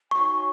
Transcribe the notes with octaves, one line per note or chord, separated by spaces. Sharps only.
D#4 F#4 C#5 G#5 C#6